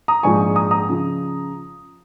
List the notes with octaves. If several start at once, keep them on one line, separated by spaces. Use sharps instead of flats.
A#5 D#6
A#1 G#2 F3 G#5 C#6
A#5 D#6
A#5 D#6
C#3 F3